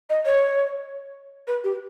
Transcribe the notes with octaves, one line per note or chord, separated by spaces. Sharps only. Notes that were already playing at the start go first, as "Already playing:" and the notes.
D#5
C#5
B4
G4